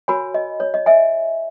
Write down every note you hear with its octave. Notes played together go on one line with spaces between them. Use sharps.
F#4 A#4 C#5 G#5 B5
D#5
C#5
D#5
E5 G#5